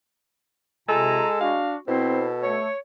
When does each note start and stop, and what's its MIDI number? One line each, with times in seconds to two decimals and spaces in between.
0.89 1.22 48
0.89 1.59 56
0.89 1.29 65
0.89 1.37 69
0.89 1.29 80
0.89 1.29 82
1.41 1.77 62
1.41 1.79 66
1.41 1.73 77
1.88 2.59 47
1.88 2.22 60
1.88 2.28 64
1.88 2.74 69
1.88 2.28 72
2.43 2.68 57
2.43 2.78 73